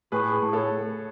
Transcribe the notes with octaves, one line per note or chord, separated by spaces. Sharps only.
A2 G#4 B4
G#4
A2
A4 C#5